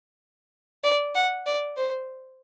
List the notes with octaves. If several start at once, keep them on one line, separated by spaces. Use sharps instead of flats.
D5
F#5
D5
C5